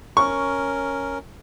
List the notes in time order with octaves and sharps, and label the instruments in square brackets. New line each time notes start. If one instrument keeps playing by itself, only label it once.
[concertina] C#4 A#4 [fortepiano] C#6